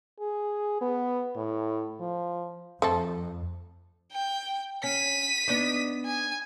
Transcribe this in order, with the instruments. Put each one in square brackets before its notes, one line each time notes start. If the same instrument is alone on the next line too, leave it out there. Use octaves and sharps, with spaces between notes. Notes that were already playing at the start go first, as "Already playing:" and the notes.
[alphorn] G#4
B3
A2
F3
[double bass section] F2 [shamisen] A3 C4 A4
[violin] G5
[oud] C#4 [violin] B6 D#7
[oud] B3 D4 D#4
[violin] G#5